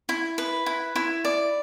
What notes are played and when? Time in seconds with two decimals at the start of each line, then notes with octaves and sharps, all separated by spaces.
0.09 E4
0.38 B4
0.66 E4
0.96 E4
1.25 D5